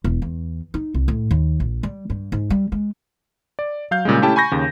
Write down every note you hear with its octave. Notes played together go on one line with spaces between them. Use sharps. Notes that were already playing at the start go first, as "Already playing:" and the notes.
E1
E2
D#4
C2
A2
D#2
A#1
G3
G2
G#2
G3
G#3
D5
F#3 F5 G6
A#2 C#3 G3 G#3
A3 C#4 E4 G4 G5 A5
G#5 B5 C#6 G6 A#6
D#2 C#3